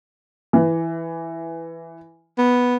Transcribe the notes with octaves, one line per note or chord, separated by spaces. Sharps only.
E3
B3